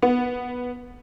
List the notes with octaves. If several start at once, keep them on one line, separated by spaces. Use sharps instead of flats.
B3